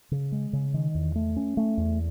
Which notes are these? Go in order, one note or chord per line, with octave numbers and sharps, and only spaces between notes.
C#3
G#3
C#3
D#3
E2
A3
C#4
A3
E2